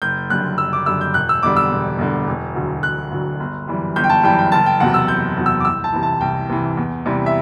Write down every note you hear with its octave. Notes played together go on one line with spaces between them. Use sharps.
F#1 G6
F#2 D3 G3 F#6
F#1 E6
D6
F#2 D3 G3 E6
G6
E1 F#6
E6
E2 D3 G3 D6
E6
E1
E2 D3 G3
E1
D2 D3 F#3
E1 F#6
D2 D3 F#3
G1
F#2 E3 G3
G1 G6
G5
A5
F#2 E3 G3 G5
G5
F#1 A5
G5
E2 C3 F#3 F#5
E6
F#1 G6
E2 C3 F#3
E6
D6
C2 E6
A5
C3 E3
A5
C2 G5
C3 E3
E2
C3 E3 G3
E5